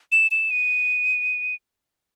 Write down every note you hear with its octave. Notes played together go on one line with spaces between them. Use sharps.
E7
E7
D#7